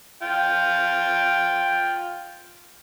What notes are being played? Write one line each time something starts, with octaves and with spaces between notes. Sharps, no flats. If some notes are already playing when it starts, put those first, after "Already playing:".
F4 G5